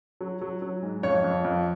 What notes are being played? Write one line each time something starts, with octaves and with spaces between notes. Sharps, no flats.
F#3
F#3
F#3
G#2
F2 C#5
F2
F2